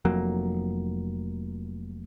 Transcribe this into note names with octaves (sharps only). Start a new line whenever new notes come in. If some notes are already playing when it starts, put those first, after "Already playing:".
F1 F2 F#3 A#3